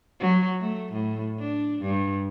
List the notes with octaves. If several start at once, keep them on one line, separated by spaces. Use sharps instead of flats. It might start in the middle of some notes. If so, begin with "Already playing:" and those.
F#3
A3
A2
D4
G2